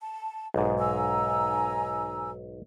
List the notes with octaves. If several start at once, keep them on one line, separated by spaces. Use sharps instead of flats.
A5
B1 G#2 G#4
G#5 A#5 E6